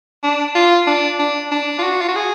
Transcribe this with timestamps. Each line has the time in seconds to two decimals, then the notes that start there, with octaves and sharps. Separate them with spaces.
0.24 D4
0.55 F4
0.87 D4
1.19 D4
1.51 D4
1.78 F4
1.83 F#4
2.01 F4
2.08 F#4
2.16 G#4